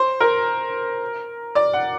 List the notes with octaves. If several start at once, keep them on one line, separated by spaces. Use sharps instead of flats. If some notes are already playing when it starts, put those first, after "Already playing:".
Already playing: C5
A#4
D5
F#5